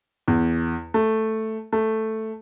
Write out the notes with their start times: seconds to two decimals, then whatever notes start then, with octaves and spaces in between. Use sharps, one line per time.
0.28 E2
0.94 A3
1.73 A3